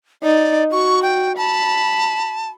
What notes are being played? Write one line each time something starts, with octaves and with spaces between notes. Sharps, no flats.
D#4 D5
F#4 C#6
G5
A5 B5